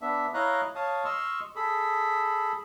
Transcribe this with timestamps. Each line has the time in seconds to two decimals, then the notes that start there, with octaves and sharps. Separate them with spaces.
0.02 B3 D4 E5
0.34 E4 C#5 D#5 F5 A#5 F#6
0.75 C#5 F5 A5 D#6
1.05 D#5 C6 C#6 E6 F6
1.56 G#4 A4 B5